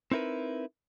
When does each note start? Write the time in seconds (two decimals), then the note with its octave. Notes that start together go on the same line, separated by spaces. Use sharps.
0.12 C4 D#4 E4 A#4 B4